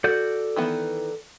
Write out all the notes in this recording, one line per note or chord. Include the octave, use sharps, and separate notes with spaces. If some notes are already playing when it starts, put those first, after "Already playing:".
F#4 A4 D5 G6
D#3 E3 B3